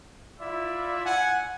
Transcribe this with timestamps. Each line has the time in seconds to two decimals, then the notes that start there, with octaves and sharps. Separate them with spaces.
0.40 E4 F4 D5 E5
1.05 F#5 G#5